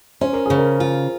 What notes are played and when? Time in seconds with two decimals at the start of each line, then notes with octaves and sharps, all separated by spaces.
0.21 C#4 C5
0.33 A#4
0.46 C#3 G#4
0.58 A#4
0.80 F4